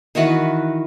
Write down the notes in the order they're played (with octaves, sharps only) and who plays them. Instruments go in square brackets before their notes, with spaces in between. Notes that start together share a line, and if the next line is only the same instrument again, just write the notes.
[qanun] D#3 E3 F#4 B4